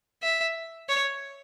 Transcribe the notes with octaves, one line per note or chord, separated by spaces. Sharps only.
E5
C#5